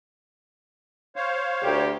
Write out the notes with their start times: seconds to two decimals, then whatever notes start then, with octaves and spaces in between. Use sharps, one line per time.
1.16 C5 C#5 F5
1.62 D2 G4